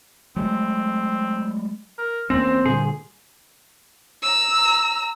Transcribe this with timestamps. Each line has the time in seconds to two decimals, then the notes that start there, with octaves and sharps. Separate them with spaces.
0.36 F#3 G#3 A3 C4
1.98 A#4
2.30 E2 A#3 C4 C#4 C5
2.66 A#2 D3 G3 G#4
4.23 A#5 E6